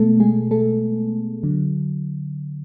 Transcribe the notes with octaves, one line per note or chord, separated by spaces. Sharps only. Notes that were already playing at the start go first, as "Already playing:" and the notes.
Already playing: B2 G#3 A3 B3 A4
G#3 G#4
A3 A4
D3 F#3